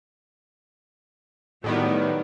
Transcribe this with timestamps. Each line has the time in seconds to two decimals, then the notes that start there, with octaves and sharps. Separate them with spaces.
1.64 A2 D#3 F#3 G3 B3